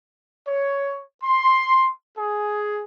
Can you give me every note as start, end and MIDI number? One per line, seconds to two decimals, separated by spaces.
0.47 1.00 73
1.24 1.88 84
2.18 2.84 68